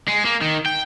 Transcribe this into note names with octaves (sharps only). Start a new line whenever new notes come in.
G#3
A#3
D#3
G5